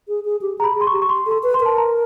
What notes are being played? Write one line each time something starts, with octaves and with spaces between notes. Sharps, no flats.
G#4
G#4
G4
G#4 A#5
B5
G#4
C6
C#6
G4
C#6
C6
A4 C6
B4
C6
A#4
A5
A#5